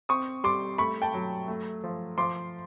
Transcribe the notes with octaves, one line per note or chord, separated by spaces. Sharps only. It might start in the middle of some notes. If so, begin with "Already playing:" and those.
C4 C#6 D#6
G3 C6 D6
A3 B5 C#6
G5 A5
F#3
A3
F3
F3 C6 D6